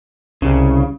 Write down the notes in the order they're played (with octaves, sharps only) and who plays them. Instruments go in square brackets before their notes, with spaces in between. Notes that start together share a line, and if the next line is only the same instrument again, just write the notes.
[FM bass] C2 [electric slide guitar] C#3